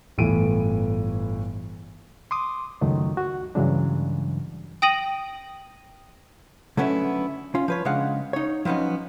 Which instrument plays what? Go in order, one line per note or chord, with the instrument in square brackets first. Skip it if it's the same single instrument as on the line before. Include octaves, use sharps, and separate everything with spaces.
[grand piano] G1 A2 E3 D7 D#7
[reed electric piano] C6 D6 D#6
C#2 F#2 D#3 F#3 A3
F#4
G2 C#3 E3 F#3 G#3 D4
[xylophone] G5 D#6 A#6 D#7 F#7
[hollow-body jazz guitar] D3 F#3 A3 B3 C#4 E4
C#4 F4
F3 B4 C#5
C#3 G#3 D4 F5 F#5
D#4 C#5
F3 F#3 B3 C#4 D#4